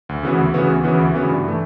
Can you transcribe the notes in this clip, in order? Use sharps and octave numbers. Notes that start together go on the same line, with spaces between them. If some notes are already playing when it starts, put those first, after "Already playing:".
D2
C#3 E3 B3 F#4
D2
C#3 E3 B3 F#4
D2
C#3 E3 B3 F#4
D2
C#3 E3 B3 F#4
G2
E3 A3